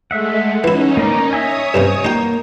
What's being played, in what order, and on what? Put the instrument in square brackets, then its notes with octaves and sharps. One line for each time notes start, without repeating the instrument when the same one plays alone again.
[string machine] G#3 A3 [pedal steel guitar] E5 F#5
[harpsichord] E3 E4 [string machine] C#4 D#4
[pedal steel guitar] A#3 A#4 D5
[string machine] C#5 D#6 [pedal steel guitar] D#5 E5 G#5
[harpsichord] G2 C3 C#4
[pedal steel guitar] A#3 [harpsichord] D#4 G5